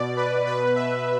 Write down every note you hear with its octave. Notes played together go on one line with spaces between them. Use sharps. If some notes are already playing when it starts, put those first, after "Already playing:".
Already playing: B2 D5
B4
B2 B4
E5